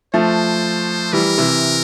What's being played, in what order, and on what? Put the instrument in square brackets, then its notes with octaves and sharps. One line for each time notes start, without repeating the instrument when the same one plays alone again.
[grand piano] F3 A3 [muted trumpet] C5
[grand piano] E3 G3 [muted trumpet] A#4
[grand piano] C3 E3